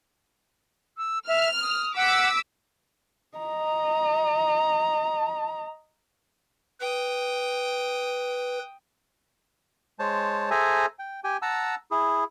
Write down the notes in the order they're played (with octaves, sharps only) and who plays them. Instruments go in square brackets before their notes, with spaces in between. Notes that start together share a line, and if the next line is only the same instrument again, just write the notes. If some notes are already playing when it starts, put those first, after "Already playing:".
[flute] E6
[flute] E5 [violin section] F6
[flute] D#6
[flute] F#5 [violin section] D6 E6 B6
[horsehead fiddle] D#5 A#5
[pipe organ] B4 [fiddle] G5 D#6
[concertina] G#3 C5 C#5 A5
G#4 A4 C5 E5 G#5 A#5
G5
G4 G5 G#5
F#5 A5 A#5 E6
E4 G#4